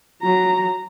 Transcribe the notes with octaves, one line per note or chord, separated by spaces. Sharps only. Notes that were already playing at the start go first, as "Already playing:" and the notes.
F#3 A#5